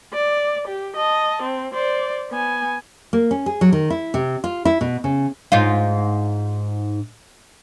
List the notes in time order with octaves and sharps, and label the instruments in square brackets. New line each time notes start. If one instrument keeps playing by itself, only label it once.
[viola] D5
G4
D#5 A5
C4
C5 D5
B3 G#5
[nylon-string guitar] A#3
C#4
G#4
F#3
D#3
E4
C3
F4
E4
B2
C#3
[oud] G#2 D#4 F4